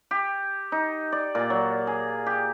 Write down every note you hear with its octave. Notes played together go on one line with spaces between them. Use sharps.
G4
D#4
D5
A#2
F#3
G#4
G4